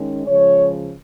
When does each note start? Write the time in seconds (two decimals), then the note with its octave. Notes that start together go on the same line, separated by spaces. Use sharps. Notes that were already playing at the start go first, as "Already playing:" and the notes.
Already playing: D#3 G#3 C#4
0.26 C#3 F3 G#3 C#5